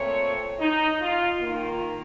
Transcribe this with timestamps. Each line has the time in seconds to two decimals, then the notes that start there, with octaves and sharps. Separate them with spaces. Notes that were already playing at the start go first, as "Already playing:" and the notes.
Already playing: A#2 A3 C4 C#5
0.59 D#4
1.00 F4
1.41 A#3 F4
1.46 D#3